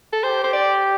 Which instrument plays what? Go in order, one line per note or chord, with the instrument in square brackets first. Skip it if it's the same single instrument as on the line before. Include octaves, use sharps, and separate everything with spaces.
[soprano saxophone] A4
[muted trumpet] G4 [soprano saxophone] C5
[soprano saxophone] C5
D5